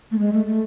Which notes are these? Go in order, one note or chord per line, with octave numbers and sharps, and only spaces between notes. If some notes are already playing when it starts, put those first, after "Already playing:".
A3
G#3
A3
A3